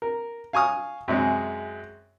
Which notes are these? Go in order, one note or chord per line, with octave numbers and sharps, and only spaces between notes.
A#4
F5 G#5 C#6 D#6 F6
F#2 C3 G#3 G#4